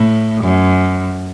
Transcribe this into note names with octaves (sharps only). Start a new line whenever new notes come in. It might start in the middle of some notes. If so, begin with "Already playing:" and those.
Already playing: A2
F#2